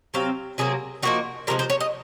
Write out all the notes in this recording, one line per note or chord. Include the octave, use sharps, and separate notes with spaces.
C3 F#3 C4 F5
C3 F#3 A#3 G#4
F3 A#3 D#4 F#4
C3 F3 G#3 A#4
C5
C#5
D#5